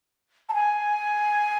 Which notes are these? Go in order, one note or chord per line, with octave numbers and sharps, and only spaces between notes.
A5
G#5